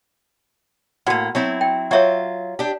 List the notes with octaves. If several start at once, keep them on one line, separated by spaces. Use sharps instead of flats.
A2 A#3 F#4 F#5
F#3 C4 E4
G5
F#3 F4 C#5 E5 F#5
D4 G4